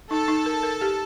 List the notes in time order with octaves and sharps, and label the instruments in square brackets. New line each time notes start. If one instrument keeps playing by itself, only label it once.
[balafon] D#4 [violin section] A4 A5
[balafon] D#4
A#4
A#4
G4